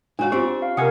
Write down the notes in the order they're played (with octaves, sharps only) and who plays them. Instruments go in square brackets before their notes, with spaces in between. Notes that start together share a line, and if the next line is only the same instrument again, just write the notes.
[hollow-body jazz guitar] G#2 F#4 F5 [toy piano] D4 C#5
[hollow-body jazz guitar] C4 D4 [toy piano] F4 G4 [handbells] C#6
[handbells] F5
[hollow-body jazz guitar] C3 G#5 [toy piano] G4 D#6 [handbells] A#4 F#5